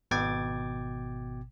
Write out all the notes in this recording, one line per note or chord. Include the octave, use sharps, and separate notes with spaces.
G#1 B2 G5 D6 G#6 A6